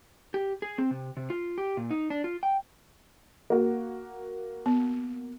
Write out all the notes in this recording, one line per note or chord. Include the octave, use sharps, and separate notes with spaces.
G4
G#4
C4
C3
C3
F4
G4
A#2
D#4
D4
F4
G5
A#3 F#4
B3